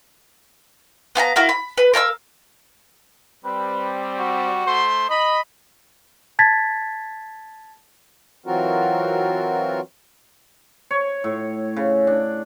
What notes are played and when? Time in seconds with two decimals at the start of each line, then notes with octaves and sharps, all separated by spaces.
1.15 B3 F5 G#5 A#5
1.36 E4 F#4 A#4 F5
1.49 B5
1.78 B4
1.94 A#4 F5 A5 E6
3.44 G3 C4 B4
4.18 F#4
4.66 A3 C5 C6
5.09 D#5 B5
6.39 A5 G#6 A6 B6
8.46 E3 F#3 C4 F4 F#4 A#4
10.91 C#5
11.24 A2
11.76 C#3
12.07 D4